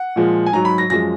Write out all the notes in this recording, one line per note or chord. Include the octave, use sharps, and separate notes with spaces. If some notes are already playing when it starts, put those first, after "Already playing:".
Already playing: F#5
A#2 F3 G#3
G#5
G#2 F#3 A#5
B5
A#6
F#2 F3 G#3 A#6